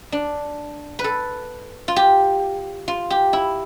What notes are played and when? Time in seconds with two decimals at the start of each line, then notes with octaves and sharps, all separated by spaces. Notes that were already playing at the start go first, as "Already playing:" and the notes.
0.12 D4
0.99 B4
1.04 A4
1.88 F4
1.96 G4
2.88 F4
3.10 G4
3.33 E4